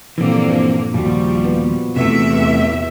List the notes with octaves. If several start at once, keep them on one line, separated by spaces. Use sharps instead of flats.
G2 A#2 D3 E3 F3 A#3 C4
D#2 G#2 F3 G3 F4 F#4
B3
E2 C3 A3 E5